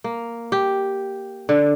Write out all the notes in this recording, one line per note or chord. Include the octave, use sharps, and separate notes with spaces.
A#3
G4
D3